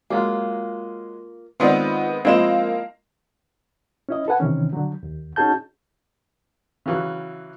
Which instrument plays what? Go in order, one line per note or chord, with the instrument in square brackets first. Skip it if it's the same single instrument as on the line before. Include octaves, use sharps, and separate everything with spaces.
[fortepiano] F#3 G#3 [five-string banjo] A#3 F4
[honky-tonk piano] D#3 G#3 B3 [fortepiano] C4 [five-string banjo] F4 D5
[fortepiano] F3 G#3 C4 [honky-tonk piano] A#3 E7 [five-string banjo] E4 F4 D#5
[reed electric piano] C#4 E4 D#5
A4 B4 F#5 G#5
C3 D#3 E3 C#4
D3 F#3
D#2
C#4 D#4 F#4 G#4 A5 G6
[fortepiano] C#3 E3 F#3